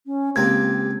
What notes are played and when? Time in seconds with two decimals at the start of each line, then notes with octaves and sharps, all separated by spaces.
0.06 C#4
0.36 C#2 A#3 C4 G4 G#6